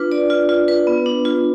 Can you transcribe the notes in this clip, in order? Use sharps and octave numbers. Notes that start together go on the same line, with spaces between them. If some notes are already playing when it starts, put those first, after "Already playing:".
Already playing: D4 F4 B4
D5
F4
F4
B4
B3
D4
F4